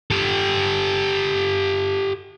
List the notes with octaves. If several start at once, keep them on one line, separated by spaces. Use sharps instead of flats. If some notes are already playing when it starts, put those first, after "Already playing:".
G4 A4